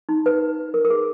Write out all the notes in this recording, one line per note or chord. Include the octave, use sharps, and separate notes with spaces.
D#4
B4
A#4
A#4
G#4